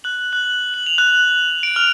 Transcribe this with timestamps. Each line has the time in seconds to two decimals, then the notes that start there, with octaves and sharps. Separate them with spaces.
0.04 F#6 F#7
0.33 F#6 F#7
0.74 F#7
0.86 F7
0.98 F#6 F#7
1.63 D7
1.76 F6 F7